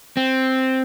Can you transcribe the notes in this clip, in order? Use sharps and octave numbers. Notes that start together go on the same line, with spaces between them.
C4